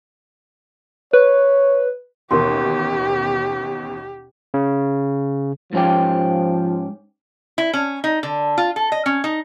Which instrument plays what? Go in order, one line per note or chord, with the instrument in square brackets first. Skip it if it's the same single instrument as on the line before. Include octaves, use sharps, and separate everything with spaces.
[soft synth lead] B4 [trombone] C#5
[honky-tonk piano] A1 D#2 B2 [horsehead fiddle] G4 [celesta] A#4 C6
[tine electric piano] C#3
[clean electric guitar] G#2 C#4 G4 [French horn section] F3
[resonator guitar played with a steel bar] E4
C#4
D#4
D3
F4
A4
D#5
C#4
D#4